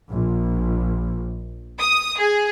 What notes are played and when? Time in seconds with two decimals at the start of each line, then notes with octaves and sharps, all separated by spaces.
0.11 A#1
1.78 D#6
2.18 G#4